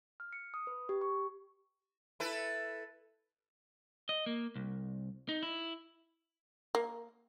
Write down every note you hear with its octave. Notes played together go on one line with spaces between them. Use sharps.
F6
C#7
D#6
B4
G4
C#6
E4 A4 B4
D#5
A#3
C2
D#4
E4
A#3